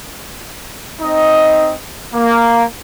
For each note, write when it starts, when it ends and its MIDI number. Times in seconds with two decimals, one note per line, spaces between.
1.01 1.73 60
1.01 1.73 63
1.01 1.73 75
2.14 2.65 58